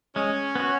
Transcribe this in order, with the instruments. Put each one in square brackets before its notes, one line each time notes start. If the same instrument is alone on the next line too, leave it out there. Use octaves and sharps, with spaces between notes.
[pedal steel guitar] G#3 [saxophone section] C#4
[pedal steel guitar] B3 F#4